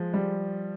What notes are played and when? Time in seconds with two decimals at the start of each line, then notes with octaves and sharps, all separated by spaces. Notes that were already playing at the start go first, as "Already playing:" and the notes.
Already playing: F3 G#3
0.14 G3